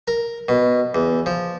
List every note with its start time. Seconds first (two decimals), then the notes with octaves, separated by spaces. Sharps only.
0.08 A#4
0.48 B2
0.95 E2
1.26 F3